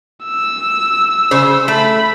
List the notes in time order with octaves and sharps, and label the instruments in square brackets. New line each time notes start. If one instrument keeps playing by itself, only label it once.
[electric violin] E6
[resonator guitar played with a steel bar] C#3 C5
[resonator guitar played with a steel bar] A3 [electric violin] B5